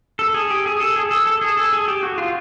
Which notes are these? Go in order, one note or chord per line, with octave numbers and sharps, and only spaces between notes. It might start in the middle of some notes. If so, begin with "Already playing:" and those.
A4
G#4
G4
G#4
A4
G#4
A4
A4
G#4
A4
G#4
G4
F#4
F4